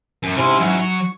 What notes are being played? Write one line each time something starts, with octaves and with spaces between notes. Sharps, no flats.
F#2
G#2 C3 C#4 E4 C6
F#3
C#6